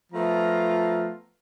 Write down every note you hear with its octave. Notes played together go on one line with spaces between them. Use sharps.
F3 A3 B3 F4 A#5